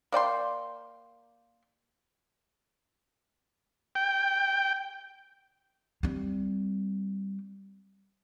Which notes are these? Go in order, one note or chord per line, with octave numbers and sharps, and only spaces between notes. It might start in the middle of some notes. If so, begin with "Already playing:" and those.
A#3 D5 G5 C6
G5
G3 C4